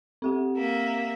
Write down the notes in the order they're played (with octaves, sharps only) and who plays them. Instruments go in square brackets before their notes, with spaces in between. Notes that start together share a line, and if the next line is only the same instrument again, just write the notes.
[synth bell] C4 G4 F#5
[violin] A#3 E5